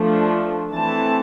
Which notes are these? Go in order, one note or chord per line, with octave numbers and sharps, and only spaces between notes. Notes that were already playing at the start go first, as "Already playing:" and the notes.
Already playing: F3 A3 D4
E3 A3 C4 A5